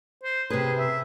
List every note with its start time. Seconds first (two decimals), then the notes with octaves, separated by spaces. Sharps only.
0.23 C5
0.50 C3 G#4 B4
0.78 E5